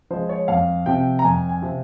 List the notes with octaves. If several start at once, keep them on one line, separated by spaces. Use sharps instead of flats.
F3 G#3 C5
C#5
F2 F5
C3 F3 C4 G5
A#5
F2 G#5
G#5
C3 F3 C4